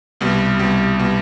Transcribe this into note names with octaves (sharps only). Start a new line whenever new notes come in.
C2 B2 G3
C2 B2 G3
B2 G3